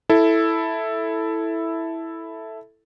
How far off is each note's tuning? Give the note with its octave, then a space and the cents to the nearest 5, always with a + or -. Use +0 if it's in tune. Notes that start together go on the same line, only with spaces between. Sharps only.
E4 +0 A4 +0